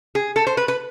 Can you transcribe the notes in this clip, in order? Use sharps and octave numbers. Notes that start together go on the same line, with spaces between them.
G#4
A4
C5
B4
B4